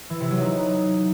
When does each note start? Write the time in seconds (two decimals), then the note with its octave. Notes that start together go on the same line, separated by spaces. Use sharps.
0.10 E3
0.20 C3
0.31 F#3
0.41 D#4